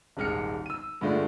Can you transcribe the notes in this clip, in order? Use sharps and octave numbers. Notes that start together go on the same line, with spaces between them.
D#1 G#1 G#3 F6 C#7
E6 D#7
G2 D3 G#3 A3 D4 F4